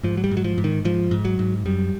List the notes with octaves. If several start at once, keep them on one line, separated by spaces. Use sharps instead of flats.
G#2 F3
F#3
G3
G#2
F#3
F3
G#2
D#3
G#2 F3
G#2
F#3
G#2
F#2 G3